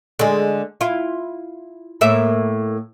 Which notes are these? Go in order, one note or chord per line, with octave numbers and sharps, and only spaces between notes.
D3 G#3
E4 F4
A2 A#3 E5